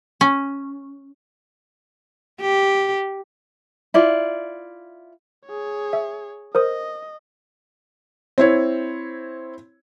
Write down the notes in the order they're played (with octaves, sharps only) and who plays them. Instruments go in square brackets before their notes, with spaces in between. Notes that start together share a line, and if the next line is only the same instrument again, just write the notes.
[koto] C#4
[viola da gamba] G4
[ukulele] E4 F4 D5
[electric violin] G#4 C#5
[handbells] E5
[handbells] A#4 C5 D#6 [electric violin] D#5
[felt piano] C4 E4 C#5